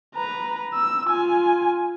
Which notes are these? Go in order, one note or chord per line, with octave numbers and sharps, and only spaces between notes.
B4 A#5
E6
F4 G#5